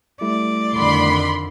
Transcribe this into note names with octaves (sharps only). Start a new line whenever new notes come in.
G3 A3 E4 D5
F2 D3 D#3 B5 C6